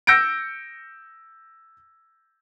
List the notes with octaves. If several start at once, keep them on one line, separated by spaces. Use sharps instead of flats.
E6 G6 A#6 C#7 D7